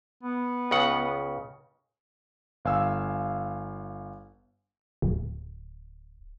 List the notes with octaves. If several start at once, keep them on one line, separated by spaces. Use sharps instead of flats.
B3
C#2 C#3 F#5
G1 F5 G#5 E6
D1